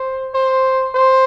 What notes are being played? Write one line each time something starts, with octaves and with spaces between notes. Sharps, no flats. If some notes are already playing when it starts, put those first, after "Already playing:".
Already playing: C5
C5
C5